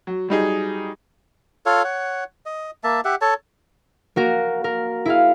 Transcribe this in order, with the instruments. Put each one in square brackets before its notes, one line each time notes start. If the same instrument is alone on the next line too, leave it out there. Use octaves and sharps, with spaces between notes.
[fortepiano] F#3
F#3 G3 D#4 G#4
[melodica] F4 A4 C#5 F5
C#5 F#5
D#5
A#3 E5 A5
G4 E5 F#5
A4 C#5 A5
[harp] A#3 F#4 A#4
A#4
E4 G#4 F5